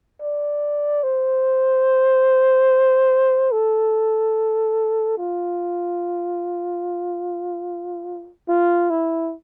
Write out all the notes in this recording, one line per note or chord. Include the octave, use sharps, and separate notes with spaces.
D5
C5
A4
F4
F4
E4